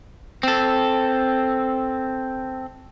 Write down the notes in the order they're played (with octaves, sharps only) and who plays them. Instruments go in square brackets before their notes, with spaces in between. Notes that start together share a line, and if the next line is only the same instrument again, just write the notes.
[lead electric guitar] C4 A4